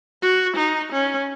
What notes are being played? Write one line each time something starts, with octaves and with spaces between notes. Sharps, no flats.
F#4
D#4
C#4